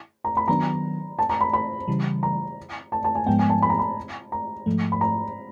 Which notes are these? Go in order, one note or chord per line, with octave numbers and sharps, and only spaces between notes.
A#5
B5
D#3 F#3 B3 D4 A#5
A5
A#5
B5
B5
C#3 E3 G3
A#5
A5
A5
G#5
G#2 F3 G#3 B3 G5
G#5
A5
B5
A#5
B5
A#5
G#2 F3 A3
B5
A#5